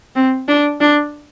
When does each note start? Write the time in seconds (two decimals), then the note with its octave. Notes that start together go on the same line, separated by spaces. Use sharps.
0.15 C4
0.48 D4
0.81 D4